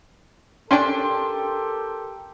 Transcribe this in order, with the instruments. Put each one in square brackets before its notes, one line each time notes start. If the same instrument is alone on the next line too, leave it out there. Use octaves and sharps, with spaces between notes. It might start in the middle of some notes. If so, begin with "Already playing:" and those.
[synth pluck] C#4 D4 [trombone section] G4 A4 A#4 [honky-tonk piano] G5 C6